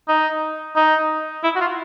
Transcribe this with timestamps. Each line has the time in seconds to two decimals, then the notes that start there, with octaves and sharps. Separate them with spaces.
0.08 D#4
0.76 D#4
1.44 E4
1.55 F#4
1.61 F4